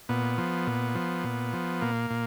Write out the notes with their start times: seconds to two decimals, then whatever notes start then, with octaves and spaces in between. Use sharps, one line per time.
0.09 A#2 B3
0.38 F3
0.67 A#2
0.95 F3
1.24 A#2
1.53 F3
1.81 A#2 A#3
2.10 A#2